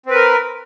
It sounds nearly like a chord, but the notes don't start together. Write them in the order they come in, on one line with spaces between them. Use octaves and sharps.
C4 B4 A#4